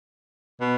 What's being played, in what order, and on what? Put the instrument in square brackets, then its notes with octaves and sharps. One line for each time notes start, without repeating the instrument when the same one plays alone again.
[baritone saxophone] B2